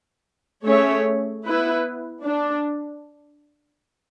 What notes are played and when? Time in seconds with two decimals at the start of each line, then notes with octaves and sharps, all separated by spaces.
0.65 A3 C#4 G#4 C#5 E5
1.45 B3 E4 B4
2.26 D4